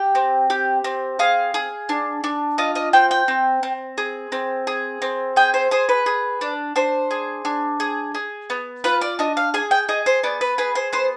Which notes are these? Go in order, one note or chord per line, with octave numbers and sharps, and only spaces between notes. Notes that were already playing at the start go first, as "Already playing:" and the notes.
Already playing: G4 G5
C4
G4
C4
G#4 F5
G#4
D4
D4
F4 D#5
D#5
C4 G5
G5
C4
C4
G#4
C4
G#4
C4
G#4 G5
C5
G#4 C5
B4
G#4
D4
D4 C5
G#4
D4
G#4
G#4
B3
F4 B4
D5
D4 D#5
F5
G#4 G#5
G5
G#4 D#5
C5
B3 D5
B4
G#4 B4
C5
B3 C5